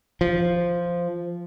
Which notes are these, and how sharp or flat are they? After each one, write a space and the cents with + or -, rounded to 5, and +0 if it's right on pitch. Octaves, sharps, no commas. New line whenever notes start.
F3 -5